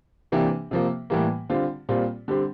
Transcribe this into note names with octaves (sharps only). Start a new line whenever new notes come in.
C3 E3 A#3 D4 G4
C3 F3 A#3
A2 E3 G3 A#3
D3 G3 C4 F4
A#2 G3 C4 F4
D3 G3 C4 G4